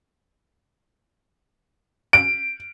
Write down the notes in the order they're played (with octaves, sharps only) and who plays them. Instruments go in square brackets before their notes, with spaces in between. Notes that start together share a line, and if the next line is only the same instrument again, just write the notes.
[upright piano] D7